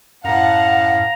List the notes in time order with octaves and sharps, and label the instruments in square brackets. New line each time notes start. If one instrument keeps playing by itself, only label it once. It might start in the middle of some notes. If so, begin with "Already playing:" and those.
[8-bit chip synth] F#2 A2 [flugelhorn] F5 [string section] F#5 A5 [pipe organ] A#5